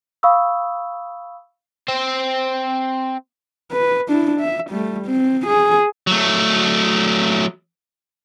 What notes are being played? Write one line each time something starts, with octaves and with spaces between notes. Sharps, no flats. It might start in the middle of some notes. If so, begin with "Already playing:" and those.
F5 B5 C#6 D#6 E6
C4 C5
B4
D4 E4
E5
G3 A3
C4
G#4
F#3 A3